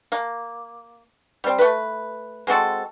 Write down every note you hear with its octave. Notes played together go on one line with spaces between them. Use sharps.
A#3
G3 C4
A3 B4
G#3 C4 F#4 A4